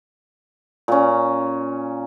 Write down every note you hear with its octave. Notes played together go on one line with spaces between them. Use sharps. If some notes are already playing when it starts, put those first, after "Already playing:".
A#2 C#4